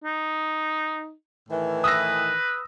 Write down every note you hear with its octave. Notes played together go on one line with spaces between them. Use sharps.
D#4
A2 D#3 E3
B4 D#6 E6 A#6